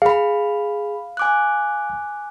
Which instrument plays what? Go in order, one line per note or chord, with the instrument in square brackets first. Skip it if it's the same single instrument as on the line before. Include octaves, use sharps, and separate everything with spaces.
[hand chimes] G#4 B5 [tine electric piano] F5
[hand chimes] G#5 D6 F#6